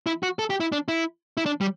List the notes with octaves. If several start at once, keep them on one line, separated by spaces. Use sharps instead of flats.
E4
F#4
A4
G4
E4
D4
E4
E4
D4
G3